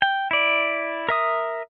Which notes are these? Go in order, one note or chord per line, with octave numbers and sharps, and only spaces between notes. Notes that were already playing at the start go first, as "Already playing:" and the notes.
G5
E4 D5
A#4 E5 D#6